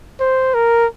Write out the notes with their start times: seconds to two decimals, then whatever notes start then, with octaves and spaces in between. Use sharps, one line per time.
0.20 C5
0.54 A#4